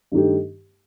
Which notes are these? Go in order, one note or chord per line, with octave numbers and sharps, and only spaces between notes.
G2 D#3 A3 D#4 G4